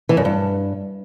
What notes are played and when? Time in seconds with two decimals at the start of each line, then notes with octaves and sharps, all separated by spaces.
0.09 E3
0.17 F#2
0.25 G2